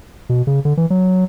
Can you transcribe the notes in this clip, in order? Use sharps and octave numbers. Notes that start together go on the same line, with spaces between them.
B2
C#3
D3
E3
F#3